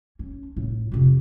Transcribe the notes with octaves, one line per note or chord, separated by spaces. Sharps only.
C#4
A1 A2
F2 C3